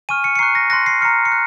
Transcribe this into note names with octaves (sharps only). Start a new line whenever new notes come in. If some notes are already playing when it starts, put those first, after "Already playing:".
G#5 C#6 F6 D#7
C#7
C#7
A#5 C#6 F#6 C7
A#6
C6 F#6 A#6
C7
A#5 F6 C#7
C#7
F#6